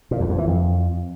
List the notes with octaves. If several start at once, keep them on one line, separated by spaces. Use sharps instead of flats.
A#2
E2
F2
E3
F2